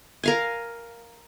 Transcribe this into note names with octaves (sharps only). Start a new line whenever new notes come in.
A#4 F5 G#5